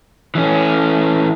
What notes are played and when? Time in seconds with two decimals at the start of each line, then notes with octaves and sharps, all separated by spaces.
0.35 E3 C#4